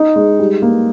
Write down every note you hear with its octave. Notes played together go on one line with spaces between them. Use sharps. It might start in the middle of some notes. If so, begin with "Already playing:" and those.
Already playing: D#4
G#3
G3
A#3